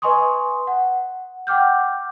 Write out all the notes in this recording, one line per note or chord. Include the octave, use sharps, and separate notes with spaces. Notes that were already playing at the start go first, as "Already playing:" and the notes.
B4 D#5 G#5 C6 C#6 D#6
F#5
F#5 G5 D6 F6 G6